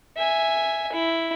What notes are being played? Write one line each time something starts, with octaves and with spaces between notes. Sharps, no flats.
E5 G#5
E4